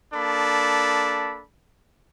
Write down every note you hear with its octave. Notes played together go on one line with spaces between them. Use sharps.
A#3 D4 A4 B5